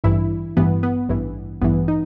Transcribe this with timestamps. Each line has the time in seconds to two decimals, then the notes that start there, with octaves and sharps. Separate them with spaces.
0.04 A1 G2 E3 E4
0.57 A1 G2 E3 B3
0.83 B3
1.09 A1 G2 E3
1.61 A1 G2 E3 B3
1.88 D#4